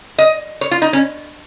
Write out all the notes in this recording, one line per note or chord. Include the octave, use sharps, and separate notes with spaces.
D#5
C#5
F4
D#4
C#4